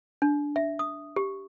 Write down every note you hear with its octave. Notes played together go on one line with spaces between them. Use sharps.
D4
E5
D#6
G4